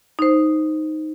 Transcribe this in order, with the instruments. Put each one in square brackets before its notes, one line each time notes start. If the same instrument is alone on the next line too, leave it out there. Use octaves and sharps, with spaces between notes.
[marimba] D#4 C5